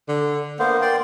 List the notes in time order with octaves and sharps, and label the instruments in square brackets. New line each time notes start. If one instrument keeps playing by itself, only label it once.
[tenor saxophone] D3
[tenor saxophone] A#3 [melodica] B3 C5
[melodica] D5 G5 C6